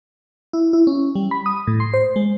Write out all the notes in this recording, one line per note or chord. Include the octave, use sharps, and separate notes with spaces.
E4
E4
C#4
G3
B5
D#6
A2
C6
C5
G#3